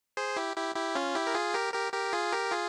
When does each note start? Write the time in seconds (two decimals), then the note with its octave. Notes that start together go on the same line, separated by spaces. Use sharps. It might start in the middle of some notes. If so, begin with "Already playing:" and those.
0.17 G#4 C5
0.36 E4 G4
0.56 E4 G4
0.76 E4 G4
0.95 C#4 F4
1.15 E4 G4
1.27 A#4
1.34 F4 G#4
1.54 G4 A#4
1.74 G4 A#4
1.93 G4 A#4
2.13 F4 G#4
2.32 G4 A#4
2.51 F4 G#4